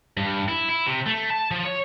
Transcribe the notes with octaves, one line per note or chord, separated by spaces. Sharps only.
G2
E4
E4
C3
A3
A5
F3
C#5